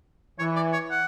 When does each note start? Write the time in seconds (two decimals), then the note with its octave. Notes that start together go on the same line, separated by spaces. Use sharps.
0.38 E3 C#5
0.56 D5
0.73 C#5
0.91 F#5